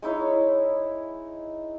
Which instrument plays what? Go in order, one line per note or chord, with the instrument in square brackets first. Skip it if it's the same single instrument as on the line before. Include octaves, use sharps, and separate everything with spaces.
[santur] G#3 D#4 E4 C#5